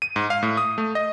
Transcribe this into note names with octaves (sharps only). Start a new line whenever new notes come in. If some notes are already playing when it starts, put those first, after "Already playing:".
D#7
G#2
F5
A2
D#6
A3
D#5